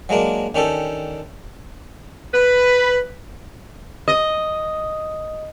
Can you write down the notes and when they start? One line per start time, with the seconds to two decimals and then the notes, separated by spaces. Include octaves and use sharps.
0.09 F#3 G#3 A#3 D4
0.55 D#3 C#4 D4 G4 A4
2.34 B4
4.08 D#5